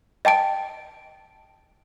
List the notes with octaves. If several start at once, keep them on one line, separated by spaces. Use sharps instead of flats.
D#5 G5 A5 D7